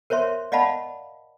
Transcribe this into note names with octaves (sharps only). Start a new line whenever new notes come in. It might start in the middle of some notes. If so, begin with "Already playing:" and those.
A#4 C5 C#5 E5 C6
D5 D#5 F5 F#5 A5 B5